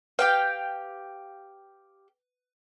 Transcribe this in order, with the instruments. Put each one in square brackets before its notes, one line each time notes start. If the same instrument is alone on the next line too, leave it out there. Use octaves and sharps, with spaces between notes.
[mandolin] G4 F5 G5 [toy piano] B4